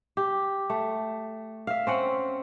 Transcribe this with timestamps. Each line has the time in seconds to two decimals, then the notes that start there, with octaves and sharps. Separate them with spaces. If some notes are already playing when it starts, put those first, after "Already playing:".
0.17 G4
0.70 A3
1.67 E5 F5
1.87 C4 C#4 F#5